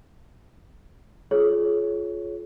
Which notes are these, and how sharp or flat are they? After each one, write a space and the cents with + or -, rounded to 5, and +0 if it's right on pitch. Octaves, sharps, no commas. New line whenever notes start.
F4 +0 G#4 +30 C#5 +0